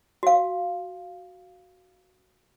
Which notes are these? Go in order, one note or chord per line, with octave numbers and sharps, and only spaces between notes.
F#4 F5